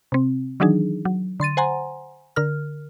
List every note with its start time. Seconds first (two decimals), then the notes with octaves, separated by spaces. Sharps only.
0.12 C3 C4
0.60 D#3 E3 F#3 D4 D#4 G#4
1.05 F#3
1.40 D3 C6 A6 D#7
1.57 C5 F#5 G#5 A#5 C6
2.36 D3 A#4 F6